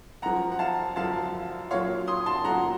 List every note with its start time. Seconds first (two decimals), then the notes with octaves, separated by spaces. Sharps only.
0.22 F#2 F3 F#5 A#5
0.52 F#5
0.59 F5 A5
0.96 F#2 F3 F5 A5
1.71 A#2 C#5 F5
1.74 F#3
2.08 C6 D#6
2.26 A5 C6
2.44 A#2 F#3 F#5 A#5